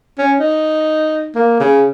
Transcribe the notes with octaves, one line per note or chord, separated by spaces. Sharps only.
C#4
D#4
A#3
C#3